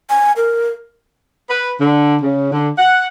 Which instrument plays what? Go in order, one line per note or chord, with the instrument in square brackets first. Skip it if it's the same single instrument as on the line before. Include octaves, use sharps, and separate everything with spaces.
[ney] G#5
A#4
[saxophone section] B4
D3
C#3
D3
F#5